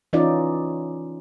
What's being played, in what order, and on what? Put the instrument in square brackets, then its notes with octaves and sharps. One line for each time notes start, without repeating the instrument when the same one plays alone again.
[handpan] E3 C#4 D#4 F4 D5